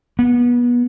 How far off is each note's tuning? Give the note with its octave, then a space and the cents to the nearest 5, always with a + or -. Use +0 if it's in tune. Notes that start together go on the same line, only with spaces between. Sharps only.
B3 -25